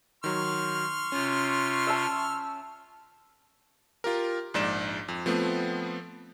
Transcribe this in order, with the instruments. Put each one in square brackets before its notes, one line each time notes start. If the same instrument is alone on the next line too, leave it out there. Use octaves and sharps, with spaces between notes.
[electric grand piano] D#3 F#3 [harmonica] C6 C#6 F6
[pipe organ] C3 F4 [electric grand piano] C#4
[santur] E5 A5
[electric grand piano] F4 G4 A#4
A#1 G#2 D5 E7
F2
F3 A3 B3 C4